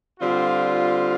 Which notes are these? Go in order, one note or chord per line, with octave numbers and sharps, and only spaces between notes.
D3 G3 C4 F4